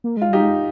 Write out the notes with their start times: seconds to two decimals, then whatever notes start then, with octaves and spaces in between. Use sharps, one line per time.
0.04 A#3
0.17 G#3 F4
0.29 G3 D#4 G4
0.41 G#3